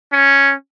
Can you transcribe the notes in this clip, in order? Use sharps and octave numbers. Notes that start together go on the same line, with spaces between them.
C#4